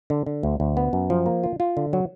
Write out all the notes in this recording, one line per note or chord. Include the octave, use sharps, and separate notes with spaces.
D3
D3
D2
D2
B3
F#2
F3
A#3
F4
F4
D3
F#3